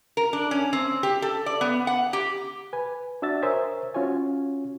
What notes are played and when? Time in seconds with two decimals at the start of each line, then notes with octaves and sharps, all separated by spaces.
0.17 A#4
0.33 D4
0.51 C#4
0.73 C4
1.03 G4
1.22 A4
1.46 D5
1.61 B3
1.87 F#5
2.13 G4
2.73 B4 G#5
3.22 D4 F#4 E5 E6 A6
3.42 A#4 C5 C#5 E5 G#5 D#6
3.94 C#4 F4 F#4 C#5 G#5